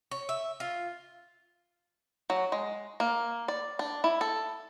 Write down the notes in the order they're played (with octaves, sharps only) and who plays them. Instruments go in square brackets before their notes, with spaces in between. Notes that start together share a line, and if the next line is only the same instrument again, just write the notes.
[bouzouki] C#5
E5
F4
[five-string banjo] F#3
G#3
A#3
D5
D4
E4
A4